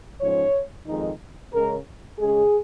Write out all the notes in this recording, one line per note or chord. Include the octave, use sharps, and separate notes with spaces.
G#2 F3 C#4 C#5
F2 D#3 G#3 D#4
C#3 G#3 C#4 A#4
C#3 G#3 C#4 G#4